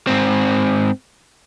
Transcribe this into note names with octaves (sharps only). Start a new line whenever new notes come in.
G#2 C4